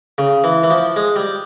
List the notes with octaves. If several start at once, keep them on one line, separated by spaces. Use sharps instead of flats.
C#3
E3
E3
F3
G#3
G3